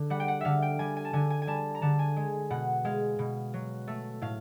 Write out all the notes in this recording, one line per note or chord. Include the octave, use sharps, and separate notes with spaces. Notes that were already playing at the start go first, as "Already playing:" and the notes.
Already playing: D3
G3 F#5
G5
F#5
D3 E5 F5
G5
G3 G#5
G#5
A5
D3 G#5
G#5
G#5
G3 A5
A#5
D3 A5
G#5
G#3
B2 F#5
G#3 F5
B2
F#3
A3
A2 F5